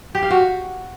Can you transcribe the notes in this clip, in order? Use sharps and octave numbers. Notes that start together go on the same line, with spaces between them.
G4
F5
F#4